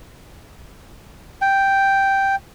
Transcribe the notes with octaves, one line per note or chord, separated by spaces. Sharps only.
G5